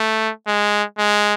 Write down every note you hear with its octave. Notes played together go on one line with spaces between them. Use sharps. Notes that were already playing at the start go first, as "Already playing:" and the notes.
Already playing: A3
G#3
G#3